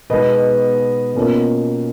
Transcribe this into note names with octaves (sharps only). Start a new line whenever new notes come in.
B2 G#3 B3 D#4 B4 D#5
B2 A#3 C#4 F4